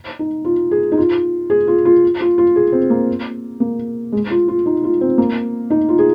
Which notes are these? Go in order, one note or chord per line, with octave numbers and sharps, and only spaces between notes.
D#4
F4
G#4
D#4
F4
G#4
F4
F4
F4
F4
G#4
C4
A#3
A#3
G#3
F4
F4
D#4
F4
C4
A#3
D#4
F4
G#4